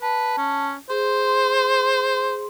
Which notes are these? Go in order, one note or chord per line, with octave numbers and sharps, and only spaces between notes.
B4 A5
C#4
G#4 C5 C6